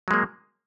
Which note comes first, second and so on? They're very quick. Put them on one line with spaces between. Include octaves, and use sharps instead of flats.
F#3 G#3 A#3